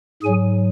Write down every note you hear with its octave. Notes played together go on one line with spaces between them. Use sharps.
G#2 F#3 G#4 G#5